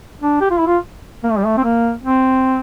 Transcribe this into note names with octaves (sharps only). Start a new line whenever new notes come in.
D4
G4
F4
E4
F4
A#3
A3
G3
A3
C4
A#3
C4